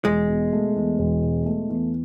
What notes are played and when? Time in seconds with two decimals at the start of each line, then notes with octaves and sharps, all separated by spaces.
0.05 E1 G#3
0.28 B2
0.53 A3
0.76 E2
0.98 E1
1.23 B2
1.46 A3
1.69 E2